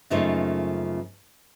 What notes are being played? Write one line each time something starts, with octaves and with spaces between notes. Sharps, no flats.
F#2 C#3 F3 A3 A#3 D#4